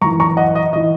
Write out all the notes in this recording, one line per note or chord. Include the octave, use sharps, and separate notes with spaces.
F#2 E3 A#5 C#6
A#5 C#6
D#5 F#5
D#5
E3 D#5